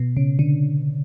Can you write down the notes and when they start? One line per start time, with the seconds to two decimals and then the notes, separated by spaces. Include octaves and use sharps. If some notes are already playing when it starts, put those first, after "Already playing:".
Already playing: B2
0.17 C#3
0.39 D3